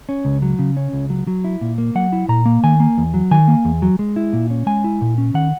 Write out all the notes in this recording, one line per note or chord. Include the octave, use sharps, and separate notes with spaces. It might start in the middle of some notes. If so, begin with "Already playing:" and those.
C#4
C#2
F#3
C#3
C#4
C#2
F#3
F#3
E4
A#2
A#3
F#3 F#5
E4
A#2 A#5
A#3
D#3 G#5
A#3
E2
F#3
D#3 G#5
A#3
E2
F#3
G#3
E4
A#2
C#4
G#3 G#5
E4
A#2
C#4
D#3 F#5